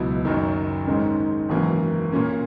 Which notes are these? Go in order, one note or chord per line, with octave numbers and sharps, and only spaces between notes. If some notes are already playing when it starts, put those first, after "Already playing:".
Already playing: C#2 B2 F#3 B3 E4
F#1 F#2 D#3
G#2 D#3 G#3 C#4
G#1 F#2 C#3 E3 A#3
A#2 A#3 C#4